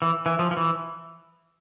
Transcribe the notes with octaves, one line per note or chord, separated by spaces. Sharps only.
E3
E3
F3
F3
E3